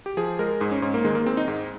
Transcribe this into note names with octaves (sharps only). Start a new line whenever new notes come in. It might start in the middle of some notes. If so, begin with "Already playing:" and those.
G4
F3 G#4
G#3 A#4
G#2 G#4
C#4
G#2 C#4
A#3
D#3 G#3
A#3
G#3 C4
D#4
G#2